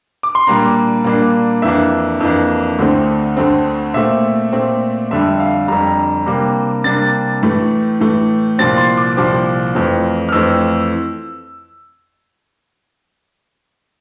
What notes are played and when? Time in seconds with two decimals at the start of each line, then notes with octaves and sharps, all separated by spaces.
0.23 D6
0.35 C6
0.47 A#2 G3 A#3 D4 A#5
1.04 A#2 G3 A#3 D4
1.62 F2 E3 A#3 D4 E5
2.20 F2 E3 A#3 D4
2.79 D2 D3 A3 C4
3.37 D2 D3 A3 C4
3.94 A#2 A3 C4 E5
4.52 A#2 A3 C4
5.11 F2 D3 G3 E5
5.39 F5
5.68 F2 D3 G3 A#5
6.26 C3 G3 A#3 D4
6.84 C3 G3 A#3 D4 A6
7.42 A2 E3 A3
8.00 A2 E3 A3
8.58 C2 A#2 F3 C4 A6
8.77 C6
8.97 D6
9.17 C2 A#2 F3 C4 D6
9.75 F2 E3 A3 C4
10.29 F6
10.32 F2 E3 A3 C4 E6